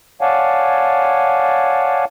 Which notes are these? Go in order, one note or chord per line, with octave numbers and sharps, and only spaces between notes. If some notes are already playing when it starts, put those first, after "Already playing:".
C#5 D5 F5 F#5 G#5 A5